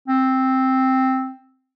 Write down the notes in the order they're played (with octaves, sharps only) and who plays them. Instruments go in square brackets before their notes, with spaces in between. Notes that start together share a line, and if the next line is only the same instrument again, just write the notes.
[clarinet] C4